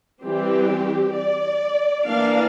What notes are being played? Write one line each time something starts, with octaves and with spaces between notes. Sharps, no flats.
E3 G3 C4 G4
D5
E3 A#3 D4 F5